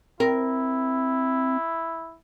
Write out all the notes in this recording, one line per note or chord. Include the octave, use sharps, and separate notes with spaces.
C4 E4 A#4